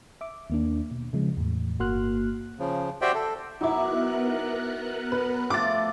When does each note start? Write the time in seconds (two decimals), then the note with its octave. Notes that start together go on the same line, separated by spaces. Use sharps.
0.21 E5 D6
0.50 D#2 A#3 D4
0.91 B2
1.13 C#3 F3 G#3
1.37 E2 A2
1.79 G1 A#3 F#4 C6 F6 F#6
2.59 C#3 F3
3.01 F#4 G4 C5 D5 E5 G5
3.14 A4
3.61 F#3 B3 D#4 E4 A#4 D6 F#6
5.12 B4
5.50 F3 A3 D6 A6